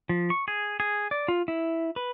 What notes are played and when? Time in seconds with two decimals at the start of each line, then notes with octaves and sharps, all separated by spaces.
0.09 F3
0.30 C#6
0.48 G#4
0.80 G#4
1.11 D5
1.28 F4
1.48 E4
1.96 B4